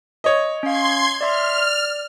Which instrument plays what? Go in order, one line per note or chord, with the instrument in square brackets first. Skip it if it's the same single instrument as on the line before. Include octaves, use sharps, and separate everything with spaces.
[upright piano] C#5 D#5
[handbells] C#4 F5 [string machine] C6 G#6
[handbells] D5 E5 C6 [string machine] F6
[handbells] D5